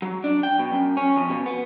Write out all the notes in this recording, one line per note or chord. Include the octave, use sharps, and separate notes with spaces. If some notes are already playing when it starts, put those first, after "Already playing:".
F#3
D4
G5
B2
F#2
C#4
F2
B2
B3